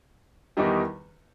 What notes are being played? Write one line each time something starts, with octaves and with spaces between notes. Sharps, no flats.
E2 D#3 G3 D#4 G4